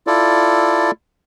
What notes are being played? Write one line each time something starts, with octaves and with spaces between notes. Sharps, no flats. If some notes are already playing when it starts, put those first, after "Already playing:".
E4 F4 A4 D5